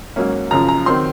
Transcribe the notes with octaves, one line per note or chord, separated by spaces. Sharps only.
G#2 F#3 A#3 C#4
F#2 C#3 F3 A#5
A#5
D#3 F#3 C4 C6